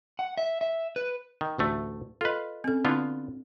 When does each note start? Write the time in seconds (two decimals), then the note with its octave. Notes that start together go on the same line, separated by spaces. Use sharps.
0.19 F#5
0.38 E5
0.61 E5
0.96 B4
1.41 D#3
1.58 A1 D2 A3
2.21 F4 A4 B4 D#5
2.64 C4 C#4 A4
2.85 D3 B3 C4 D4 E4 F4